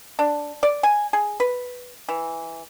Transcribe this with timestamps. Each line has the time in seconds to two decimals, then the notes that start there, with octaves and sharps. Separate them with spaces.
0.19 D4
0.63 D5
0.83 G#5
1.13 G#4
1.40 B4
2.09 E3